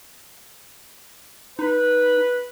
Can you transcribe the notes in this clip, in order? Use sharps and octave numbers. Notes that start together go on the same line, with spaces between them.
D#4 B4